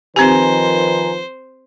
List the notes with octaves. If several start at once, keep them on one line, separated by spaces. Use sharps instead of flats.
D#3 F3 C4 G4 B4 C5 G#5 A#5